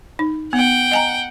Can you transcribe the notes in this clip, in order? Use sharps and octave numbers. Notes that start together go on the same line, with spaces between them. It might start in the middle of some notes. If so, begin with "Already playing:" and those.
D#4
B3 F#5 G5
D#5 G#5 A#5